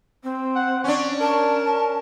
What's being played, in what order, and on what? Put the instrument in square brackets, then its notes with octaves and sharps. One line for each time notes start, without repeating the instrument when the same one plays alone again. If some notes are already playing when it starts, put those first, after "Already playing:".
[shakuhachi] C4
[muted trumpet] F#5
[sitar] C#4 D4 [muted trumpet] C#5
[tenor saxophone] A#4 [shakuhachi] A5
[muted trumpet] C#4